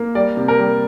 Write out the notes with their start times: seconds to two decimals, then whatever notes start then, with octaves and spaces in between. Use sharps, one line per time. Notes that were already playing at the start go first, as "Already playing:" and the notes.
Already playing: A#3
0.15 G3 D5
0.37 C3
0.48 A#4
0.59 G3